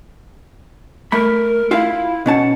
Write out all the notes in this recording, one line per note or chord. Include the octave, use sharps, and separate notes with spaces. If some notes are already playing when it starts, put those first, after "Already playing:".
A3 A#4 B5
E4 F4 E5 F5
B2 C#4 F#5 A5